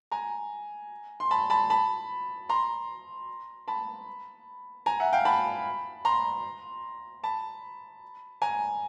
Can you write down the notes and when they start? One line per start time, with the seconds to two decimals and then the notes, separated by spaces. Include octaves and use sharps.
0.11 G#5 A#5
1.20 C6
1.31 A5 B5
1.50 A5 B5
1.70 A5 B5
2.49 A#5 C6
3.68 A5 B5
4.86 G#5 A#5
5.00 E5 F#5
5.13 F5 G5
5.25 A5 B5
6.05 A#5 C6
7.23 A5 B5
8.42 G#5 A#5